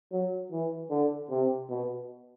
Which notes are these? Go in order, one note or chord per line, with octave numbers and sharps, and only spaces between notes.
F#3
E3
D3
C3
B2